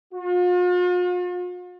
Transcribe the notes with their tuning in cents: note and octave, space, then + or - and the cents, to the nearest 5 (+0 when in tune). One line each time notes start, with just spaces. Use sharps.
F4 +45